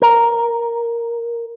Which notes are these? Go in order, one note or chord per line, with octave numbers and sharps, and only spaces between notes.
A#4